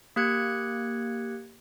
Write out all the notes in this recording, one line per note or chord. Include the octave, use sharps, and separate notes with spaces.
A#3 G4 F#6 G#6 C#7